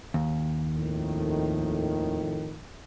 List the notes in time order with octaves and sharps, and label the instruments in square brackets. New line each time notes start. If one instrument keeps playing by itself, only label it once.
[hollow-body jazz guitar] D#2
[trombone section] F2 A2 D#3